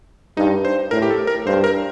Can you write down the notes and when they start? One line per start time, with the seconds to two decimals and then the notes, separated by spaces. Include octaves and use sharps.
0.37 G2 D#4
0.65 C5
0.91 A2 A#4
1.02 G4
1.10 A4
1.27 A#4
1.46 G2 C5
1.64 A#4